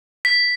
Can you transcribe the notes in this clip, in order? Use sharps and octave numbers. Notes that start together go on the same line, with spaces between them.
B6